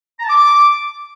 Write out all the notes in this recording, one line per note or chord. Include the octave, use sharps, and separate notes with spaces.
A#5
A5
D6